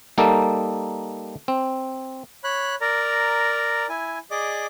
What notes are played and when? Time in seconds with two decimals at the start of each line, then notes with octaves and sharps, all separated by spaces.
0.18 G3 A#3 D#4 A4
1.48 C4
2.44 C#5 B5 F#6
2.81 A#4 D5 A#5
3.89 E4 G#5
4.31 G#4 D5 D#5 D6